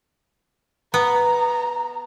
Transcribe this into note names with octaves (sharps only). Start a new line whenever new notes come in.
B3 A#5